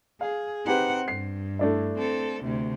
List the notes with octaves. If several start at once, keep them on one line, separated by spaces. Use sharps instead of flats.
G#4 F5
C4 D#4 G4 B4 F#5
G2 C7
A3 D4 E4
C4 A4
D2 C3